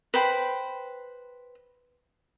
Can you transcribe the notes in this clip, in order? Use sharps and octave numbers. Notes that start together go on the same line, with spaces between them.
B4 C5 G5 B5